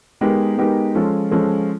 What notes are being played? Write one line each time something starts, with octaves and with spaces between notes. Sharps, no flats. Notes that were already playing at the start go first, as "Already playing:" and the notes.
G#3 B3 D#4 G4 A#4
G#3 B3 D#4 G4 A#4
F3 G#3 C#4 F4 A4
F3 G#3 C#4 F4 A4